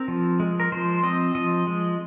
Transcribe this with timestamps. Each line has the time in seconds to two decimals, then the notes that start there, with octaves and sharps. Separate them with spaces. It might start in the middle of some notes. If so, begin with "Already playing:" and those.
Already playing: C4 A#4
0.08 F3
0.40 G#3
0.60 A#4
0.72 F3 C5
1.03 C4 D#5
1.35 F3 D#5
1.67 G#3